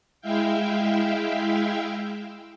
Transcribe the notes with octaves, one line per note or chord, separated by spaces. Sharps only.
G#3 E4 E5 F5 G5